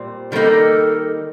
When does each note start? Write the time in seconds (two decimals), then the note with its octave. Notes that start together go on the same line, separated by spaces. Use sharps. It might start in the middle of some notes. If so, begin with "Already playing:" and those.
Already playing: A#2 G3 C4
0.32 D#3 G3 A#3 D#4 A4